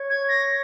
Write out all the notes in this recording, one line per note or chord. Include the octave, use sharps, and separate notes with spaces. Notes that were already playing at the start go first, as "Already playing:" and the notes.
Already playing: C#5
G#6
A#6